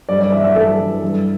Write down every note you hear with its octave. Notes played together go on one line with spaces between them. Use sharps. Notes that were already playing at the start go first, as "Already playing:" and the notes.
G2 D5
D5
E3 E5
E5
G2 A4
E3
G2